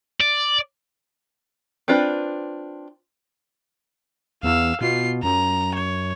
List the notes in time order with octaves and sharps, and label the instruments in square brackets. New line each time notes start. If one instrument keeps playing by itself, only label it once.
[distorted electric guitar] D5
[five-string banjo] C4 D4 F4 B4
[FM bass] E2 [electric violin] F5 E6
[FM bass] B2 [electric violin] F4 C7
[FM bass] F#2 [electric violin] A#5
[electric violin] C#5